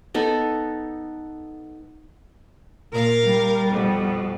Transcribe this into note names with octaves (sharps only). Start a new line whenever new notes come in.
B3 D#4 A4
A#2 A#4 F5
G3
F2 B2